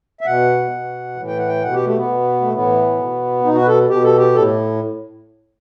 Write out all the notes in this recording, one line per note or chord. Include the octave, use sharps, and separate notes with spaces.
E5
B2 F#5
B2
A2 E3
G5
F#5
G5
B2 F#5
G4
A3
B3
B2
A3
A2 E3 B3
B2
B2 D#4
F#4
B4
A4
B2 G4
A4
G4
A2 A4